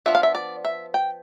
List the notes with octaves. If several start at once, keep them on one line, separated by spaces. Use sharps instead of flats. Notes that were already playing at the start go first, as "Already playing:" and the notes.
F3 B3 D4 E5
F5
E5
D5
E5
G5